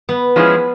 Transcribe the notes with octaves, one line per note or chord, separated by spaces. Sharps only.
B3
F3 G#3 C#4 E4 G#4